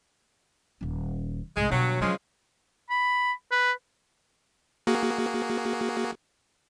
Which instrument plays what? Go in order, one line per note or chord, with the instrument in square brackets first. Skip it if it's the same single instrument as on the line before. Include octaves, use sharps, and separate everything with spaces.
[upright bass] D#1 C#4
[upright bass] C2 G#2 [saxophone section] G#3
[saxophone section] G2 F#3 [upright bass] B2 D3
[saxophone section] C#3 F3 G#3 [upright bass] F#3 D4
[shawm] B5
B4
[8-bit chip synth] A#3 F#4 G#4